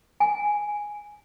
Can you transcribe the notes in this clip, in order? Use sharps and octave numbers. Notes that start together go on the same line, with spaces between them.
G#5